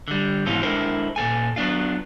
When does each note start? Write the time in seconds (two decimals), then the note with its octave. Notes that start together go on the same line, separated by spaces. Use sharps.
0.08 D3 G3
0.46 G#2 B2 E3 C4 C#4 F4
0.63 G#3 D4 E4 A4 A#4 C5
1.16 A#2 A4 G#5
1.56 F#3 B3 D4 F4